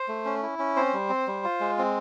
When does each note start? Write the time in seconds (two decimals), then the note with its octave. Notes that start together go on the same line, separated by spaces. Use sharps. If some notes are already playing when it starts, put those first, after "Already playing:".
Already playing: C5
0.08 A3
0.25 C#4
0.43 E4
0.59 C#4
0.76 C4 C5
0.93 G3
1.09 C4
1.27 G3
1.44 F4
1.60 G#3
1.78 C4